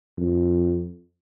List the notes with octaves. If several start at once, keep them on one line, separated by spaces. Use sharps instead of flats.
F2